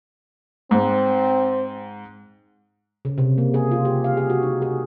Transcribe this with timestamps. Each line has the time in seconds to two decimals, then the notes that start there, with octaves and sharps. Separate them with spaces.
0.71 G#2 C4
3.05 C#3
3.18 C3
3.38 A#3
3.54 G#4
3.71 F4
3.85 G4
4.04 F5
4.17 G#4
4.30 F#4
4.43 D#4
4.62 G#4